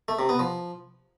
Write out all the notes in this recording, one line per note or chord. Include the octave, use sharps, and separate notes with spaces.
A3
C3
B3
F3